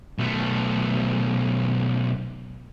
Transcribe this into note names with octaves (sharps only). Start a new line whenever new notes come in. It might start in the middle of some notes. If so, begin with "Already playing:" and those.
B1 A3